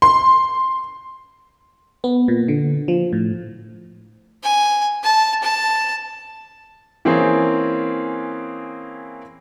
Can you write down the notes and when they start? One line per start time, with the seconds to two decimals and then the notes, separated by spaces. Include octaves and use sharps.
0.02 C6
2.04 B3
2.28 A#2
2.48 D3
2.88 F3
3.13 A2
4.44 G#5
5.03 A5
5.43 A5
7.05 E3 A#3 C4 C#4 G#4